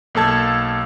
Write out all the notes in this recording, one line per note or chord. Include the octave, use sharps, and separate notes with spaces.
B1 A#3 A4 A5 G#6